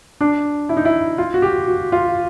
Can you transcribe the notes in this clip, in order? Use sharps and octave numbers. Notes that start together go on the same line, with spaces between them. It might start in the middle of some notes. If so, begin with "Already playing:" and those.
D4
E4
D#4
E4
F4
F#4
G4
F#4
F4